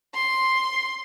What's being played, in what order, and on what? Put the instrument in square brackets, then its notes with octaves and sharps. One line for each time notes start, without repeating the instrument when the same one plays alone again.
[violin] C6